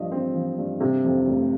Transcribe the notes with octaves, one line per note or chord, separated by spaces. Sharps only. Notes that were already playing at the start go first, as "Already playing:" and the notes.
Already playing: G2 F3 D#5
C4
F3
G2
C3
F2
F1